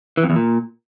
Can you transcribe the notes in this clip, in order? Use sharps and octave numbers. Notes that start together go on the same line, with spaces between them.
E3
F2
E2
A#2